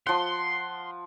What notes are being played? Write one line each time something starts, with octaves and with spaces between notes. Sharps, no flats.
F3 F#5 C6